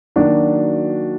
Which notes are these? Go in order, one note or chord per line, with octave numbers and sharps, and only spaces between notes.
D#3 F#3 A#3 D4 F#4